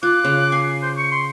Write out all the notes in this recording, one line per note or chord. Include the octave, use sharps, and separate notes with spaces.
F4 D6 F#6
C#3
G#5 C7
C5
C#6 C#7
C6